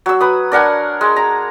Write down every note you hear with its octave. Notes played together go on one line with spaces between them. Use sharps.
F#3 E6
B4 D#6
D4 A#4 F#5 G#5
G#3
A#5